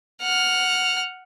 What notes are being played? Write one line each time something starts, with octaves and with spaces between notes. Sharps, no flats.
F#5 F6